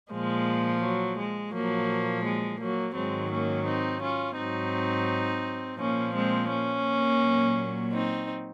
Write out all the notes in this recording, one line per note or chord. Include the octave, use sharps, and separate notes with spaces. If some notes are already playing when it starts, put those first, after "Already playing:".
A#2 F3 G#3
F#3
G#3
A#2 F3 F#3 A#3
G#3
F#3 A#3
G#2 D#3 F#3 G#3 C4
A#3 C#4
C4 D#4
C#4 F4
G#2 F#3 C4 D#4
A#2 F3 A#3 C#4
G#3 C4
A#3 C#4
A#2 F#3
C4 D#4